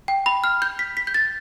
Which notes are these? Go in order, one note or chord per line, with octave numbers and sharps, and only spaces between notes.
G5
B5
F6
G6
B6
B6
G6
A6